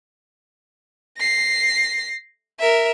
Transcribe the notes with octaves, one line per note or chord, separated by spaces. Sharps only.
A#6 C7
A#4 E5